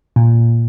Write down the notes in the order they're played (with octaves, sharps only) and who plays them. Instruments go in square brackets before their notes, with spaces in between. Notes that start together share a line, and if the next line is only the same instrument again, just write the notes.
[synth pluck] A#2